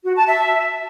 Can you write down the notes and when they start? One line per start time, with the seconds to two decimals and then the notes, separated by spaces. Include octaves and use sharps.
0.04 F#4
0.15 A5
0.26 E5